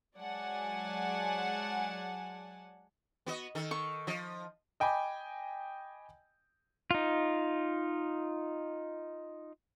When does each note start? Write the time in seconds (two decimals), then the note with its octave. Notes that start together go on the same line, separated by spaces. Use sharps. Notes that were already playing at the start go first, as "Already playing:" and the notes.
0.18 F#3 G#3 D5 F#5 G#5 A5
3.26 B3 F#4 D#5
3.55 D#3 A4
3.71 C#6
4.07 F3 D#5
4.80 D#5 G5 G#5 B5 D6
6.91 D#4 F4